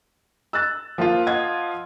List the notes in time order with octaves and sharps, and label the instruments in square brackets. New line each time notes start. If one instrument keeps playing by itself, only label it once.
[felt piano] E6 F#6 A6
[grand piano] F3 F4 [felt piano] A#3 F5
[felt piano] D#5 F#5 G#6